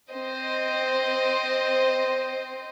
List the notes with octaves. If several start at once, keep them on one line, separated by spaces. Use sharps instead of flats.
C4 C5 D#5